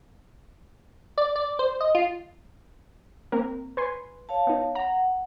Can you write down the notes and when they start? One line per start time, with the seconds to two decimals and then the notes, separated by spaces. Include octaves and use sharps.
1.18 D5
1.36 D5
1.59 C5
1.81 D#5
1.95 F4
3.32 A#3 C4 A#4
3.77 B4 G#5 C6
4.29 C#5 F5 A5
4.47 B3 D#4
4.75 F#5 A#5